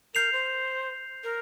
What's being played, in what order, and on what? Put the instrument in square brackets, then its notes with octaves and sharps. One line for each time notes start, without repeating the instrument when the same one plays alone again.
[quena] A#4 [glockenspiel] G6 C7 F7
[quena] C5
A#4